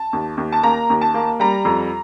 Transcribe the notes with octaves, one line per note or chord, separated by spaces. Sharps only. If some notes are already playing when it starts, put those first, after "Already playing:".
Already playing: A5
D#2
D#2
A5
A#3 A#5
D#2
A5
A#3
G3 A#5
F2